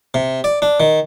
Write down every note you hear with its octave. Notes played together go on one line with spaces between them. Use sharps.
C3
D5
D4
D#3